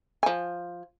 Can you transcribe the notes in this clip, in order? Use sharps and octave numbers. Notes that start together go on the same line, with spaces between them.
F3 G#5